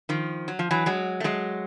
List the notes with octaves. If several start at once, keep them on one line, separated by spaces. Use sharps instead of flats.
D#3 F3
F#3
F3
E3 F#3
F#3 G#3
A3
F#3 G#3